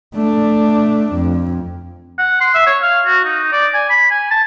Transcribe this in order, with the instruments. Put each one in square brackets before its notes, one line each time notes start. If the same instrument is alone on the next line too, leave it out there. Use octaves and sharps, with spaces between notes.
[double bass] A3 D4
F2
[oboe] F#5
C6
E5
C#5
F5
F#4
D#4
D5
G#5
B5
G#5
A5